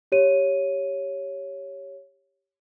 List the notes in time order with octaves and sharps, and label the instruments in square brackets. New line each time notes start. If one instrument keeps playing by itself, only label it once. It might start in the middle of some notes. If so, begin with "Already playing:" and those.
[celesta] G4 C#5 D#7